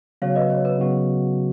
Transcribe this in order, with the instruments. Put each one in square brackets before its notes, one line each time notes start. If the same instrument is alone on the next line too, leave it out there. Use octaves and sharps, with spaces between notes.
[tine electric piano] C#3 F#3 B3 F#4 [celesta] C#5 F5
[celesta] B4 D#5
C#5
B4
[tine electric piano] C#3 F#3 B3 F#4